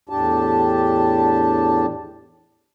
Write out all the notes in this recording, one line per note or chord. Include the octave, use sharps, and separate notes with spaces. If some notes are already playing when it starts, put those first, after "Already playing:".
E2 A2 D4 G4 A5